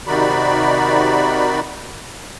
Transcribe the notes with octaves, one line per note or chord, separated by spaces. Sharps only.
C3 D#3 D#4 F#4 D5 B5